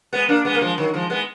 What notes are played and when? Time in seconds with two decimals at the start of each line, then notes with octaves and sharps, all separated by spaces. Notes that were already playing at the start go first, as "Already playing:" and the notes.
0.13 G#3 B3
0.29 A#3 D4
0.45 G#3 B3
0.55 A#3
0.61 F3 G#3
0.77 D#3 F#3
0.94 F3 G#3
1.10 G#3 B3